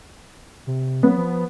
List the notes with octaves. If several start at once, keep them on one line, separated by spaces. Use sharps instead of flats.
C3
F#3 B3
F3